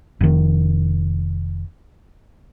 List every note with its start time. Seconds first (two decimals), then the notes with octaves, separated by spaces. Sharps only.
0.21 F1 D#3